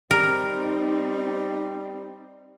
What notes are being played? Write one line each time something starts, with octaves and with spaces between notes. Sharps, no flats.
G3 C4 D#4 A#4